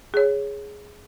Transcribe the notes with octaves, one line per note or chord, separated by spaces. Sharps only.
G#4 C#5